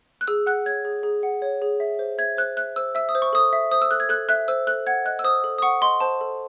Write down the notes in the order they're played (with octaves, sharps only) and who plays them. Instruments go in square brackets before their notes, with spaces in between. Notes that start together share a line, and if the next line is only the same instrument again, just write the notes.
[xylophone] F#6
G#4 E6
F#5 F#6
C#5 G#6
G#4
G#4
F#5
C#5
G#4
E5
C5
E5 G#6
C5 F#6
E5 F#6
C5 E6
E5 E6
D#6
C5
C#6
A4 D#6
E5
C5 D#6
E6
A4 F#6
G#6
A4 F#6
E5 F#6
C5 E6
A4 F#6
F#5 G#6
D#5 F#6
E6
C5 D#6
A4
D#6
F#5 C#6
D#5 C6
C5 A5
A4